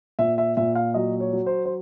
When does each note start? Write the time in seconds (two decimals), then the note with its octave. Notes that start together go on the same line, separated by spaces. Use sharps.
0.19 A#2 E5
0.38 E5
0.57 A#2 E5
0.75 F5
0.94 F#3 D#5
1.20 C#5
1.33 F#3
1.46 C5
1.66 C5